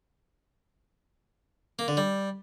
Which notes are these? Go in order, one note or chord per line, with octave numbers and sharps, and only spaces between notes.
A#3
D3
G3